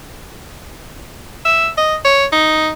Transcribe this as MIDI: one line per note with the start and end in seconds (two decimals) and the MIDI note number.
1.45 1.68 76
1.77 1.96 75
2.05 2.26 73
2.32 2.70 63